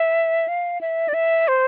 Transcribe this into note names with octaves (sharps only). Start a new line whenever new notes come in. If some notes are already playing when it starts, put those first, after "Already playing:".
Already playing: E5
F5
E5
D5
E5
C5